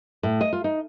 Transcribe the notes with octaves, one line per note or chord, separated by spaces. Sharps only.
A2
D#5
F4
D#4